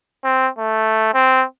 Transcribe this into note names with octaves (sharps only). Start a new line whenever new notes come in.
C4
A3
C4